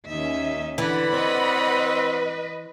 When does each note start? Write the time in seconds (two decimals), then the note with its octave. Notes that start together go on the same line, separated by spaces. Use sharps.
0.10 D#2 C#4 D#4 E5
0.78 D3 E3 D5 F#5 B5
1.14 C4 B4 D#5